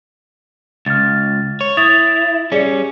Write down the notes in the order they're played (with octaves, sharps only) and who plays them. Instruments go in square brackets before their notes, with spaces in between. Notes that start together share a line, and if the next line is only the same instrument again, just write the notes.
[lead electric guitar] C#2 [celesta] F6 A6
[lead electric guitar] C#5
[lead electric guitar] E4 [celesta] D#6 A6 F7
[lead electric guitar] G3 C#4 [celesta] G#4 D5 C#7